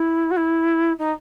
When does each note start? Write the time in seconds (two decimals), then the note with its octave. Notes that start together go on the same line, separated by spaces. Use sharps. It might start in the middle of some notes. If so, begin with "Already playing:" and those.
Already playing: E4
0.30 F#4
0.36 E4
0.98 D#4